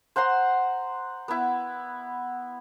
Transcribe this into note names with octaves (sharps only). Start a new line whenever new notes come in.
C5 F#5 A#5 C6
B3 E4